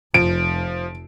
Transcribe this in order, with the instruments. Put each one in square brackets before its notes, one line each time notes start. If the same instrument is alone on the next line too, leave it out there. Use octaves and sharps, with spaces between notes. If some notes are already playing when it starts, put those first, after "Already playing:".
[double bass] F1 [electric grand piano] F3 [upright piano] D7